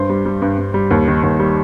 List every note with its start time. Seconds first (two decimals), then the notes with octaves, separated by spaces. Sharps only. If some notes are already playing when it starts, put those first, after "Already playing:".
Already playing: G2 C5
0.09 G3
0.25 G3
0.42 G2
0.58 G2
0.74 G3
0.91 D#2
1.07 D#3
1.23 D#2
1.39 G3